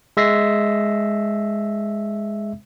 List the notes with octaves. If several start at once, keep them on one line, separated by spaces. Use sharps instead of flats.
G#3 E5 A#6 C7